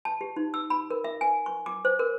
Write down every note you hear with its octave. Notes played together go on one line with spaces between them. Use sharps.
A5
G4
D#4
E6
B5
A#4
E5
G#5
C#6
D6
C5
A#4